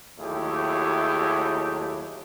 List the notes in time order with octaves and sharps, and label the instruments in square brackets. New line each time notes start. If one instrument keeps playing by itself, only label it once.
[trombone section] D#2 F#3 A3 E4 G4 G#4